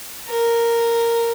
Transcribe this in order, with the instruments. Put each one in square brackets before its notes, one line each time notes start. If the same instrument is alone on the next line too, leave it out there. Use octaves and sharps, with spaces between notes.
[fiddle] A#4